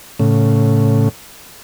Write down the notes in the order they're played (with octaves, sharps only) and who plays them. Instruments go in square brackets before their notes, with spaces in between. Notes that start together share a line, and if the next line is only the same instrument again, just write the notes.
[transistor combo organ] A2 C#3